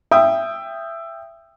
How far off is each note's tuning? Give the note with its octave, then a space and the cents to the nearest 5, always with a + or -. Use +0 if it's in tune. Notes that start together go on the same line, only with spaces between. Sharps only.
E5 +15 G5 +10 D#6 +0